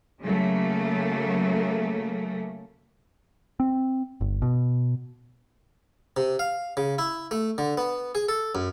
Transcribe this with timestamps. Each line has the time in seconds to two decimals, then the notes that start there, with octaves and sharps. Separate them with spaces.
0.23 C#3 F#3 A3 A#3
3.60 C4
4.21 G1
4.42 B2
6.17 C3
6.39 F5
6.77 C#3
6.98 E4
7.31 A3
7.58 D3
7.78 B3
8.15 G#4
8.29 A4
8.55 F#2